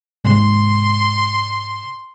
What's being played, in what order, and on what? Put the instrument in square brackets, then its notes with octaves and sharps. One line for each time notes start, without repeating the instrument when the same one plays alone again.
[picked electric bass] G#2 C3 G#3 [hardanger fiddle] C6